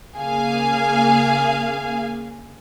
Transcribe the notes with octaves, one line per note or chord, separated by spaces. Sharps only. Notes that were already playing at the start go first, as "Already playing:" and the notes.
C#3 A#3 G#4 F5 G#5